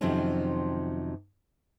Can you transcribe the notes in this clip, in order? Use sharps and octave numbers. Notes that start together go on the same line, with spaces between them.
F2 C3 D#3 F3 F#3 C#4